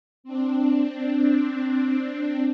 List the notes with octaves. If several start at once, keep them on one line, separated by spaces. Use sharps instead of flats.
C4 D4